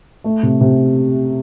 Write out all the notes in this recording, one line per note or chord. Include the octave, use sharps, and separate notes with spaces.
A3
C3
C3